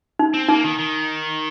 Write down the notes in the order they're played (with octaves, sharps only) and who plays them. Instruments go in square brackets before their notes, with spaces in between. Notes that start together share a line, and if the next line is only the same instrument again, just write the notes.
[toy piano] D#4
[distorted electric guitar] C4
[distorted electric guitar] A#3 [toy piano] D#4
[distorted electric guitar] D#3
D#3